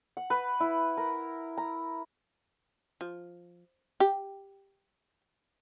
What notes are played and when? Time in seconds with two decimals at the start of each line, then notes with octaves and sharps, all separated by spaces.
0.17 F#5
0.30 B4
0.60 E4
0.97 A#4
1.57 A#5
3.01 F3
4.00 G4